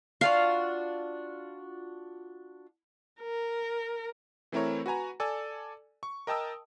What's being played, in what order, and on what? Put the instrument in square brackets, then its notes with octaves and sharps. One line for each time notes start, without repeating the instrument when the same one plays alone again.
[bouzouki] D4 F4 F#4 [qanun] F5
[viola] A#4
[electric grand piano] E3 A3 C4 E4 A#4 C#5
F#4 B4 G#5 A#5
A4 D5 G#5 E6
C#6
A#4 D#5 G5 A5 D#6 E6